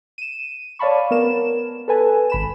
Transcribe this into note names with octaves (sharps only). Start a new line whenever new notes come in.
D#7 E7
C#5 D5 F5 A5 B5 C#6
B3 A#4 E7
A4 B4 G#5 A5
G#1 B5 E7